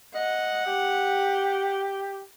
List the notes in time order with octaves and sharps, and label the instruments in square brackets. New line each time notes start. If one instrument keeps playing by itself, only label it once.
[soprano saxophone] D#5 [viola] F#5
[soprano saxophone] G4